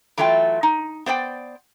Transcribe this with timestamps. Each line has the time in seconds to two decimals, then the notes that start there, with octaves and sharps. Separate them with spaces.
0.18 E3 F#3 A3 F4 D#5 G5
0.63 D#4
1.06 B3 C5 D5 G5